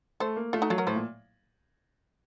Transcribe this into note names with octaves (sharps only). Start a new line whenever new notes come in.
A3 A4 C5
A#3
A3 F4 A4
D#4 F#4
F#3 F4 A4
F#4 A#4
A2 A4 C5
A#2